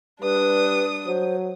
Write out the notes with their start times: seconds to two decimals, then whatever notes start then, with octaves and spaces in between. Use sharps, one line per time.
0.22 G3 D4 B4 D#6
1.06 F#3 C5